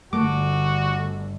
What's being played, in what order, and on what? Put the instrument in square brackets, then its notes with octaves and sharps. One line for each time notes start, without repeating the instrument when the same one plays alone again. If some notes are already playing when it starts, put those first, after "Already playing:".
[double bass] G1 D3 [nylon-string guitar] A3 [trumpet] F#4 [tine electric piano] D6